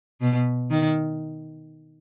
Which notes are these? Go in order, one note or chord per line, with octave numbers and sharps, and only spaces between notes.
B2
D#3